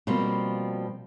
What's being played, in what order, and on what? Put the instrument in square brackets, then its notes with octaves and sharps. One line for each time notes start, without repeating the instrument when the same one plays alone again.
[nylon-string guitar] B2 F3 G3 A#3 C4